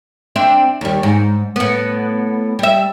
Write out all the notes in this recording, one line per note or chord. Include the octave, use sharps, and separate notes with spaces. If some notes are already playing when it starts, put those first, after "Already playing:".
C4 D4 E5
D#2 G3
G#2
A2 B3
G3 E5